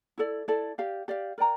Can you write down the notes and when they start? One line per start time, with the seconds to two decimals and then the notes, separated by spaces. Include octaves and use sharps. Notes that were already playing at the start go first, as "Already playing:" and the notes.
0.18 E4 A4 D5
0.48 E4 A4 D5
0.78 G4 D5 F5
1.08 G4 D5 F5
1.38 A#4 D5 G5 A#5